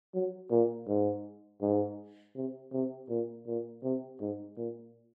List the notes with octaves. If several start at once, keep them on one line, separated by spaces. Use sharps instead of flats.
F#3
A#2
G#2
G#2
C3
C3
A#2
A#2
C3
G#2
A#2